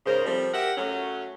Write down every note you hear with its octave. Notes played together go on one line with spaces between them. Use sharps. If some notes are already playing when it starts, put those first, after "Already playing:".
G#2 C#3 A#4 C5
F3 G3 A3 C4
G4 A#4 E5 F#5
F#2 F#3 A3 C#4